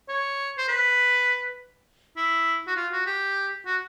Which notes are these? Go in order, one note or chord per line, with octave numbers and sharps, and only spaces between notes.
C#5
C5
B4
E4
F#4
F4
F#4
G4
F#4